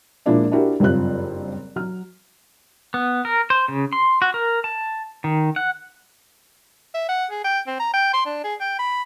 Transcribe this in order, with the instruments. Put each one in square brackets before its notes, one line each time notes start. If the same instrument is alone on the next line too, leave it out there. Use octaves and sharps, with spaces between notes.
[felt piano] A#2 F3 G#3 A#3 D4 E4
D4 E4 F#4 G4 A#4
F#1 G2 C4 F4 F#6
F#3 F6
[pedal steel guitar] B3
A#4
C5
C#3
C6
F#4
A#4
A5
D#3
F#5
[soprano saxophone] E5
F#5
G#4
G5
C4
A#5
G5
C6
D4
G#4
G5
B5